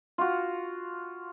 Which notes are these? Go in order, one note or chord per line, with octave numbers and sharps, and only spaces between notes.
F4 F#4